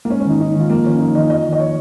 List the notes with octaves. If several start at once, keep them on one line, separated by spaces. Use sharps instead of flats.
A#3
G#2 C#4
C#4
D#3
D#4
G#2 D#4
D#3
F4
F2 A#3
D#3 C#4
F2 D#4
D#3 D#5
F2 D#5
D#3
D#5
C#5